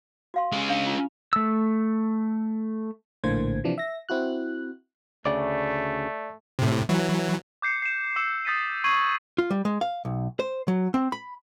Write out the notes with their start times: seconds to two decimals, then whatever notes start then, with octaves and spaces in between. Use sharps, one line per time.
0.34 F#4 F5 C6
0.52 G#3 C#4 G4 C#6
0.69 D4 F5
0.86 F4
1.33 A3 E6
3.24 A#1 A2 D3 A#3 C5 G#6
3.64 C3 E3 F3 D4
3.78 E5 A#6
4.09 C4 E4 F#4 F#6
5.26 D2 C#3 A3 D5
6.59 A2 C3
6.89 E3 F#3
7.62 D6 G6 C7 C#7
7.82 C7 E7
8.16 D6 E6 C7 C#7 E7
8.45 D#6 G6 A6 B6 C#7 D#7
8.84 C#6 G#6 C7 D#7 F#7
9.38 F4
9.51 G3
9.65 G#3
9.81 F5
10.05 B1
10.39 C5
10.68 F#3
10.94 C4
11.12 B5